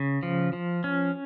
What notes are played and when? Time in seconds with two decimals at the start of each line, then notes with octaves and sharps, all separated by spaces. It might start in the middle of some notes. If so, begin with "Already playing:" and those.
Already playing: C#3
0.23 F3
0.53 F3
0.84 C#4